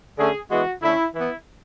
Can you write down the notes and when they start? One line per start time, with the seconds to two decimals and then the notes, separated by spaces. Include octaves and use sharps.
0.18 D3 A3 C#4 G#4
0.50 E3 G#3 B3 F#4
0.82 D3 A3 C#4 E4
1.14 E3 B3 E4